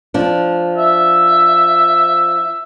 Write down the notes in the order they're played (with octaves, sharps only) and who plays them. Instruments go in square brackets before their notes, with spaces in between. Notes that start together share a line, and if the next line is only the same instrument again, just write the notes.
[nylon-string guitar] F3 D4
[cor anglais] E5